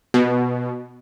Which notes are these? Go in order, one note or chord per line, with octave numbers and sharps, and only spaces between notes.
B2